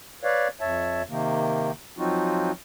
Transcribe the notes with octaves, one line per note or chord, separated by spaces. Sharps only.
B4 C#5 D5 F5
F2 C#5 E5 A5
C3 D#3 A#3
F3 F#3 C4 D#4 F4 F#4